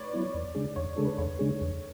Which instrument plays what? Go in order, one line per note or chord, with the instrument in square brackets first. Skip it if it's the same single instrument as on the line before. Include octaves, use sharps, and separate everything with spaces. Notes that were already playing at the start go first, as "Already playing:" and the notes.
Already playing: [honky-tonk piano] B4 C#5 D5
[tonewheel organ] F#3 B3 E4
E2
C#3 G#3 D4 G#4
[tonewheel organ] E2 [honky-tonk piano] C#5
[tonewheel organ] C#3 G#3 D4 G#4 [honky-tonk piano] A4
[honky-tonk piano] B4
[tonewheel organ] E2 [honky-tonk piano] C#5
[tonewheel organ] C#3 G#3 D4 G#4
E2